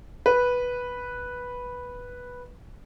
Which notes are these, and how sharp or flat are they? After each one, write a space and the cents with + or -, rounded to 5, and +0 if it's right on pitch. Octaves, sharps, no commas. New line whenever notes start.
B4 -5